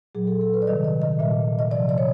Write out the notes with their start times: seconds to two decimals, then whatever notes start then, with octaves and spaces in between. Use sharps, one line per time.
0.15 A#2 F#3 G#4
0.27 A4
0.41 A4
0.54 B4
0.62 D5
0.67 C3 D#3 G3 D#5
0.84 D#5
1.02 D#5
1.19 A#2 G3 E5
1.59 D#5
1.71 C3 F3 D5
1.89 D5
1.98 C#5